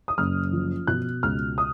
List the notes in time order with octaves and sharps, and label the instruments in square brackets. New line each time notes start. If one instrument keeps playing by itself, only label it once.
[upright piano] D#6
F#1 F6
F3
B2 F#6
C#2 F6
D#6